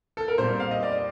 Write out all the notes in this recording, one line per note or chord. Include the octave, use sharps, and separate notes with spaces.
A4
A#4
A#2 G3 C4 C5
F5
D#5
D5